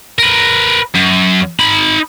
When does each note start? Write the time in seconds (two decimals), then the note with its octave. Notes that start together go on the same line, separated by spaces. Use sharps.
0.19 A#4 B4
0.95 F#2
1.59 D#4 B5